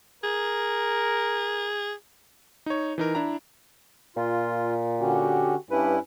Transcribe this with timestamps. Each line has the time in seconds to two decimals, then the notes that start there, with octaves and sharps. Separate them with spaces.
0.24 G#4 A#4
2.66 D#4 C#5
2.98 E3 D#4 A#4
3.15 D4 E4 A#5
4.16 A#2 F4
5.00 D3 C#4 F#4 G4
5.71 G2 C#4 E4 B4